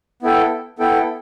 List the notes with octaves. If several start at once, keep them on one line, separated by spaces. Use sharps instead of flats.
B3 E4 A4 G5
B3 E4 A4 G5